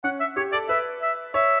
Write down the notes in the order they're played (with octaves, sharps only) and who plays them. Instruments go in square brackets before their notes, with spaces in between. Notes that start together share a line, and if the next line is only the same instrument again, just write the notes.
[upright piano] C#4 [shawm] F#5
[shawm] E5
[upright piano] G4 [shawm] C#5
[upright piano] A4 [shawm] D5
[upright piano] B4 [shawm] E5
[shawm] E5
[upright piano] C#5 [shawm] E5